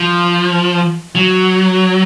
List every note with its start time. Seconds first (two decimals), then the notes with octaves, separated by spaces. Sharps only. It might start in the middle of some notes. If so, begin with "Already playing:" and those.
Already playing: F3
1.16 F#3